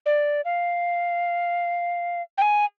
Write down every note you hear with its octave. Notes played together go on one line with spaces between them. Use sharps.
D5
F5
G5
G#5